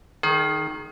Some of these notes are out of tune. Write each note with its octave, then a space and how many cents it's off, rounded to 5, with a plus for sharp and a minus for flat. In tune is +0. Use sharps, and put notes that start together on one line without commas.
D#3 -5 G#4 +35